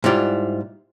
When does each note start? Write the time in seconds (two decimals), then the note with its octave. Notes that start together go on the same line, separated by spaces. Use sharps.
0.04 G#2 G3 E4 F4 D5